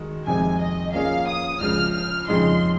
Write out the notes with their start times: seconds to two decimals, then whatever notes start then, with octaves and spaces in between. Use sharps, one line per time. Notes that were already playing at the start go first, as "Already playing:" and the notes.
Already playing: D#3 G#3 D#4 F#4
0.27 F2 C3 D#3 G#3 C4 G#5
0.60 D#5
0.94 F3 A#3 C#4 G#4 C#5 F5
1.27 D#6
1.61 C#2 C#3 F3 F6
1.94 F6
2.28 F2 C#3 F3 G#3 D#4 C6